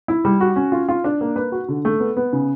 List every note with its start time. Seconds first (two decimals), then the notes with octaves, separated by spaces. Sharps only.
0.08 E4
0.25 G3
0.40 F#4
0.56 C#4
0.72 F4
0.89 F4
1.04 D4
1.21 A#3
1.36 B4
1.52 F#4
1.68 D3
1.85 A3
2.00 B3
2.17 B3
2.33 C#3